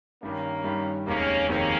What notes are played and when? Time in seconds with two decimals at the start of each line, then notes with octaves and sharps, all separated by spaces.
0.23 G2 D#3 G3 A#3 C#4
0.64 G2 D#3 G3
1.06 F1 D#2 D#3 G#3 A#3 C4 C#4
1.48 F1 D#2 D#3 G#3 A#3 C4 C#4